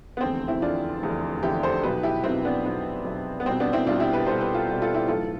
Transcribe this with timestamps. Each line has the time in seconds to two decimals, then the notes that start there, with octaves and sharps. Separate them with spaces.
0.17 B3
0.21 F1 E2 D3 C4
0.48 C4 E4
0.61 F1 E2 D3 D4 F4
1.02 F1 E2 D3
1.43 F1 E2 D3 E4 G4
1.63 A4 C5
1.83 B1 B2 G4 B4
2.03 E4 G4
2.24 B1 B2 C4 E4
2.45 B3 D4
2.64 B1 B2 B3
3.05 B1 B2
3.40 B3
3.46 C2 B2 C4
3.60 B3 D4
3.73 C4 E4
3.86 C2 B2 D4 F4
4.00 E4 G4
4.13 G4 B4
4.27 C2 B2 A4 C5
4.41 G4 B4
4.54 F4 A4
4.68 C2 B2
4.82 F4 A4
4.95 E4 G4
5.08 B1 A2 E3 F4 A4